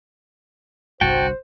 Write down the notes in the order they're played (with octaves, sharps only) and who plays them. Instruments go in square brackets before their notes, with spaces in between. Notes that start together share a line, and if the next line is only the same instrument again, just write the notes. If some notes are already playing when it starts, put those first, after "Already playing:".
[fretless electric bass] G1 C2 G2 [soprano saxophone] F#4 [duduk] C5 [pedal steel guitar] G5 A5